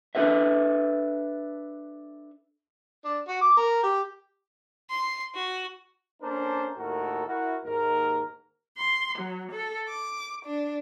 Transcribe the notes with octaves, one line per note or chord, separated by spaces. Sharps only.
D4 A4 B4 E5
D4
F#4
D6
A#4
G4
C6
F#4
A#3 C#4 D4 A4 A#4 C5
D#2 A2 F#4 A4 A#4
E4 F#4 A#4
D#2 G#2 A#4
C6
F#3
A4
D6
D4